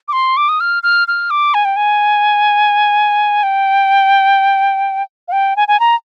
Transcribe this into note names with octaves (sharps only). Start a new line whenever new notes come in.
D6
C6
D6
D#6
F6
F6
F6
D6
G#5
G5
G#5
G5
F5
G5
G#5
G#5
A#5